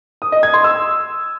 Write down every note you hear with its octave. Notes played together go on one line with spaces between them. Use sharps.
D#6
D#5
G#6
C6
E6